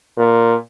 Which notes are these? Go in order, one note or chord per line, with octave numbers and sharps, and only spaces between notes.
A#2